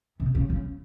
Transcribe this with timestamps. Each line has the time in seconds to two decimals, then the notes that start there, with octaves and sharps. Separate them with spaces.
0.20 C3
0.35 C#3
0.50 C#3